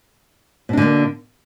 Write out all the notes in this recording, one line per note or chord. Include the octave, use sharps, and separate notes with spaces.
B2 D3 A#3 D4